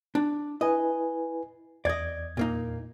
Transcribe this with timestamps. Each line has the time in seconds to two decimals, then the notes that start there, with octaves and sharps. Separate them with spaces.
0.15 D4
0.61 E4 B4 D#5 G#5
1.85 E2 D5 D#5 G#6
2.37 A#2 A#3 D#4